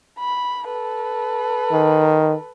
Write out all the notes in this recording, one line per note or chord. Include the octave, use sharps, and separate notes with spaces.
B5
A4 B4
D#3